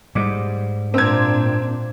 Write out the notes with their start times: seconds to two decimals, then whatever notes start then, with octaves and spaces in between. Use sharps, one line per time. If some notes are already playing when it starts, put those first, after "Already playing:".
0.15 G#2 G3 D6 E7
0.94 A#2 C4 D4 E5 A#5 E6 G#6